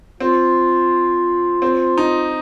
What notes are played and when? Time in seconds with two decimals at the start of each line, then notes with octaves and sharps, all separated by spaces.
0.20 C4 F4
1.62 C4
1.98 D#4